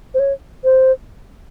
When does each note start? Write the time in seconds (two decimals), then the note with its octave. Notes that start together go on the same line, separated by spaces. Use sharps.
0.14 C5
0.19 C#5
0.64 C5